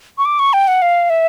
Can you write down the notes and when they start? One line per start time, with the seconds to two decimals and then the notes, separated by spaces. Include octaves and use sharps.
0.18 C#6
0.25 D6
0.39 C#6
0.53 G5
0.68 F#5
0.82 F5
1.10 E5